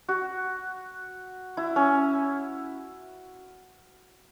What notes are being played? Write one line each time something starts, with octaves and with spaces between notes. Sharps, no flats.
F#4
E4
C#4